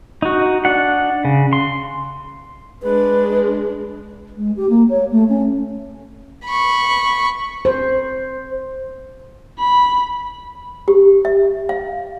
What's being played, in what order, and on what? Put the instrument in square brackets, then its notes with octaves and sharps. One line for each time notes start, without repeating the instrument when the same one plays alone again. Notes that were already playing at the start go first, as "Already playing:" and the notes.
[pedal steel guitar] D#4 F#4
D4 F#5
C#3
C6
[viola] G#3 D4 [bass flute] B4
[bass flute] G#3
G4
A#3
C#5
A3
C#4
[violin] B5 C#6
[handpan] C5
[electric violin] B5
[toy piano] G4
E5
F5